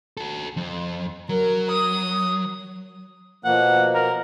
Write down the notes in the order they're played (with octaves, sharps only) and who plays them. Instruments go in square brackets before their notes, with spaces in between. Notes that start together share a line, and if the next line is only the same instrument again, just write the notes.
[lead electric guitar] F#4 A4
F2
[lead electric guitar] F#3 [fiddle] A#4
[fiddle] D#6
[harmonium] B2 F3 A#3 [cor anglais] F#5
[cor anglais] A#4